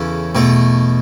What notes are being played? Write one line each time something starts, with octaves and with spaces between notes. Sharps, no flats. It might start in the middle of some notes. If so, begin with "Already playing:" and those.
Already playing: E2 C#3 E3 C#4 A4
E2 B2 A3